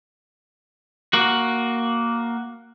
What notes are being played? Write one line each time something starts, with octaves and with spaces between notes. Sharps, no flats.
A#3 F#4